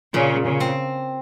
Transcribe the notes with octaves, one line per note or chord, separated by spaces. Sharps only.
A#2 C#3
C#3
C4